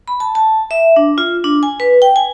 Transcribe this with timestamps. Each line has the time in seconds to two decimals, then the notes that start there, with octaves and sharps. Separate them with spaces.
0.08 B5
0.20 A5
0.35 A5
0.71 E5
0.96 D4
1.18 F4
1.44 D4
1.63 G#5
1.80 B4
2.02 G5
2.16 G#5